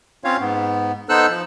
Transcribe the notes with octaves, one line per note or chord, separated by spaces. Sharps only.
C4 C#4 F4 C#5 F5
G#2 B3
B3 D#4 A4 C5 E6 F#6
F3